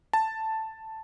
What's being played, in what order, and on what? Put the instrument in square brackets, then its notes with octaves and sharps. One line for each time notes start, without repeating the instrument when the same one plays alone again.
[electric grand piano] A5